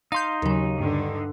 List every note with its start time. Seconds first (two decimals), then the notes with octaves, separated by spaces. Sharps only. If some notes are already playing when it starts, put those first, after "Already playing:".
0.12 D#4 F5 C6 G6
0.42 D#2 C#3 F#3
0.78 G2 D3